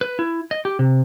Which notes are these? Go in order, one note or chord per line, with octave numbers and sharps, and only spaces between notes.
B4
E4
D#5
G4
C3